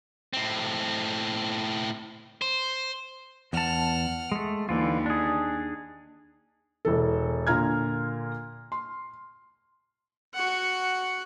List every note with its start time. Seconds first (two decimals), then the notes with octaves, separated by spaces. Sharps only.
0.33 A2 C4
2.42 C5
3.53 E2 F#5 A5 F6
4.32 G#3 A3
4.69 D#2 D3 E3 F4
5.06 D4 G#4
6.85 E1 E3 A4
7.47 A#2 D3 F4 A#5 F6 G#6
8.72 C6
10.34 F#4 F#5